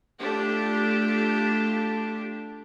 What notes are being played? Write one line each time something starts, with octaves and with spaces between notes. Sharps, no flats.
A3 D4 F4 G4